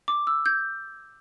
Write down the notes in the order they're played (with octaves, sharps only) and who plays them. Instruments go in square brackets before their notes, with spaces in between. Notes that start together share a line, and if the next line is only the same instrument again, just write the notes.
[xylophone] D6
E6
G6